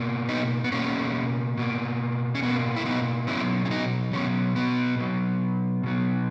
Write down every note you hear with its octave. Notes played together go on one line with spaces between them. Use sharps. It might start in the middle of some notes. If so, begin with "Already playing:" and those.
Already playing: B2 A#3
B3 D#4
B3
B2 A#3 C#4
B2 A#3
C#4
B2 A#3 B3
E4
B3 D#4
B2 F#3 B3 C#4 E4
C#4
B3 D#4
B2 F#3 B3 C#4
B3
B2 F#3 B3
B2 F#3 B3